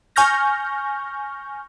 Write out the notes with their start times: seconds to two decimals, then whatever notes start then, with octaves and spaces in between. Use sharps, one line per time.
0.16 G#5 C#6 F6 G6 A#6